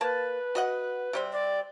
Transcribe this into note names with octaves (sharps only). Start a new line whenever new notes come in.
A#3 B4 A5
F#4 D#5 F#5
C3 G3 C4
D5